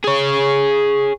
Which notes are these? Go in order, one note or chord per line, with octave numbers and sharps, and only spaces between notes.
G#4 C#5